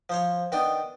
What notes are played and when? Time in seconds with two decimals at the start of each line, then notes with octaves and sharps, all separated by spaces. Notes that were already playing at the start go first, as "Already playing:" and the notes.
0.09 F3 C5 C#5
0.52 D#3 B3 D4 G5